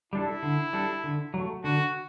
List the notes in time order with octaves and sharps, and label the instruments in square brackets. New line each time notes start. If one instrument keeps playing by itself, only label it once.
[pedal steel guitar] G3 D4 A4 [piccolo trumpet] E4
[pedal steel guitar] D3
G3 D4 A4
D3
F#3 A3
[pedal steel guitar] D3 [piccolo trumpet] F#4